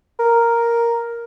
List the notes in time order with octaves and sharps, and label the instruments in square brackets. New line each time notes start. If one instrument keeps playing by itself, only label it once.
[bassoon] A#4